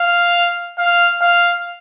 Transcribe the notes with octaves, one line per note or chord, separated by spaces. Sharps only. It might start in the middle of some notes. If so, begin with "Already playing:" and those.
Already playing: F5
F5
F5